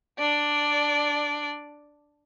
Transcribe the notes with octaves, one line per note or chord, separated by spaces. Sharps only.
D4 D5